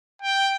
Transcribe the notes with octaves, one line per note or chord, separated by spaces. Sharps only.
G5